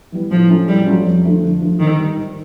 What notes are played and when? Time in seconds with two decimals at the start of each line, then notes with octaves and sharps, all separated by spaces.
0.12 E3 G3 B3
0.31 A2 F3
0.50 F#3 A3 C#4 F4
0.68 A2 G3
0.87 F#3 A3 C#4 F4
1.05 F2
1.24 D3 F3 A3
1.43 F2
1.61 D3 F3 A3
1.79 G#2 D#3
1.98 D#3 G3
2.17 G#2